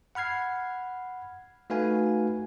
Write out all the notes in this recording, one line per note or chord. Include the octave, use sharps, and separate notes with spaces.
F#5 B5 F6 G#6 C7
A3 D#4 F#4 B4 F5 G#5